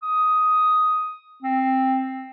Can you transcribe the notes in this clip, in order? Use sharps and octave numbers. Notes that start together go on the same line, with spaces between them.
D#6
C4